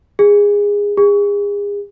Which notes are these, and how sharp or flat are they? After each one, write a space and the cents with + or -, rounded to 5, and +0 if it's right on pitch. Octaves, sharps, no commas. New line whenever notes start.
G#4 -20
G#4 -35